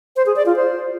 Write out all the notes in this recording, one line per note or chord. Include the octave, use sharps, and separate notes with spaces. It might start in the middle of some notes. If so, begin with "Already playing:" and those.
C5
G#4
D5
F4
C5